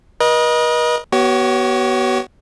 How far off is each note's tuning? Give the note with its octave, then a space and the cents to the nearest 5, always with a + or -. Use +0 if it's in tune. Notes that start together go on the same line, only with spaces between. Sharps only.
B4 -45 D#5 +0
B3 -15 F#4 +45 C#5 +0